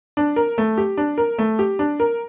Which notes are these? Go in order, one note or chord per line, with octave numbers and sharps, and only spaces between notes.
D4
A#4
A3
G4
D4
A#4
A3
G4
D4
A#4